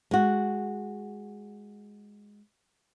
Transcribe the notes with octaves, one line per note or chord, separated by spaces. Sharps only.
G#3 F#4